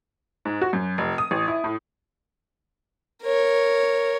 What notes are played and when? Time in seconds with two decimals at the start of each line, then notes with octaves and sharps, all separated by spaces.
0.45 G#2
0.62 F#4
0.73 F#2
0.98 F1
1.18 D#6
1.31 A1
1.48 E4
1.64 A2
3.23 A#4 C#5